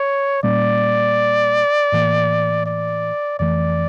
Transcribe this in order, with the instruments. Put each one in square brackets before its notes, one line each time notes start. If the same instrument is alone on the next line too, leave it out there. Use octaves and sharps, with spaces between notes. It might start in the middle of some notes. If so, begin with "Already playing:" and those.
Already playing: [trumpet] C#5
[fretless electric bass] A#2 G3 A#3 C#4 [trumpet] D5
[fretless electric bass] A2 E3 A#3
[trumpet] D5
[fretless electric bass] F2 E3 A3 [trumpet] D5